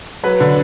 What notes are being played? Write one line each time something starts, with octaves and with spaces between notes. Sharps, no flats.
F#3 B4
D3